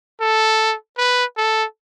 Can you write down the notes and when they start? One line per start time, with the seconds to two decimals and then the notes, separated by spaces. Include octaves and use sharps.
0.21 A4
0.98 B4
1.37 A4